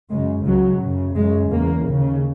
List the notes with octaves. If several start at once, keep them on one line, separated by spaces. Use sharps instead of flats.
F#2 C#3 G#3
C#2 C#3 F#3
F#2 C#3
F#2 C#3 G#3
E2 C#3 A#3
D#2 C#3